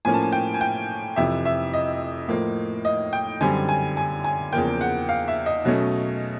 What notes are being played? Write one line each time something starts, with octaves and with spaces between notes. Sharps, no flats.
A2 F3 A#3 C#4 G#5
A5
G#5
G5
G#5
G5
F2 C3 E3 E5
E5
D#5
A2 F3 A#3
D#5
G5
F#2 D3 G3 C4 G#5
G#5
G#5
G#5
E2 C#3 F3 A#3 G5
F#5
F5
E5
D#5
B2 F#3 A3 C#4